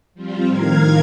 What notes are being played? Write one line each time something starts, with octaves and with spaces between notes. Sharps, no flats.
F3 G3 C4 F4
A2 D#3 A#4 F5 A#5 G#6